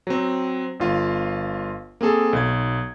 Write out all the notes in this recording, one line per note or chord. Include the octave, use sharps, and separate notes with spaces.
F#3 C4
G1 F4 F5
A#3 C4 G#4 A4
B1 G#6